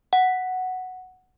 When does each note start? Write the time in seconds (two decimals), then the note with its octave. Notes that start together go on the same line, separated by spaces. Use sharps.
0.13 F#5